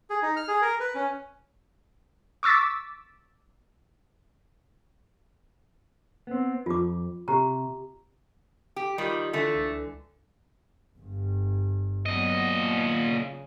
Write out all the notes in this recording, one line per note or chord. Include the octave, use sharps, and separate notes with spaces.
G#4
D#4
F6
G#4
A#4
B4
C#4
C#6 D6 E6 A6 B6
B3 C4
F2 F4 D6
C3 G4 A#5
G4
D#3 G3 F4
D3 E3 A3
C#2
G1 G2
A#2 F#3 B3 D#5
C#3